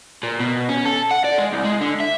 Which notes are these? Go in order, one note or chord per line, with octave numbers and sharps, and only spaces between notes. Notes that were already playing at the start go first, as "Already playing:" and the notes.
A#2
B2
C#4
A4
F#5
D5
G#3
C2
G#3
D3
E5